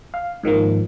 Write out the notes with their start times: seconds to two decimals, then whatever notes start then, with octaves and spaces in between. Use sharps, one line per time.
0.14 F5
0.43 G#2 D#3 F3 A#3